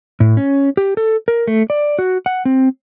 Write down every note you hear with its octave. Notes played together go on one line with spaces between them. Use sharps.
A2
C#4
G4
A4
A#4
A3
D5
F#4
F#5
C4